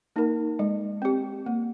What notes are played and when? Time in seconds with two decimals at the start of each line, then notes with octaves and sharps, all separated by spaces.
0.16 A#3 D#4 A#4
0.59 G#3
1.02 C4 G4
1.46 A#3